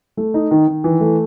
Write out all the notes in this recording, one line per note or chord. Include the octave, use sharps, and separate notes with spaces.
A3
D#4
D#3
D#3
E3
A3